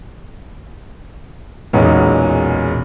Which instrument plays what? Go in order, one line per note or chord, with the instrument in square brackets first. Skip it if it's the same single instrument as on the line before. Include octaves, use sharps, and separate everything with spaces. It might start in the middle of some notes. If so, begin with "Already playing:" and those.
[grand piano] B1 E2 A#2 F#3 G#3 C#4